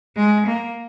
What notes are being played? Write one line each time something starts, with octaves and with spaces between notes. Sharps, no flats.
G#3
A#3